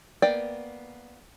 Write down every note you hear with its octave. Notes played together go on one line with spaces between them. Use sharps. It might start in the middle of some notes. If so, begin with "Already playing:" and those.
A#3 B3 D5 G5